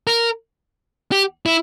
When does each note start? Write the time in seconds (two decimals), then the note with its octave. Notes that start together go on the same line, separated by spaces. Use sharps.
0.07 A#4
1.12 G4
1.46 E4